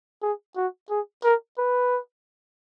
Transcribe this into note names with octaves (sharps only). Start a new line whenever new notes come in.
G#4
F#4
G#4
A#4
B4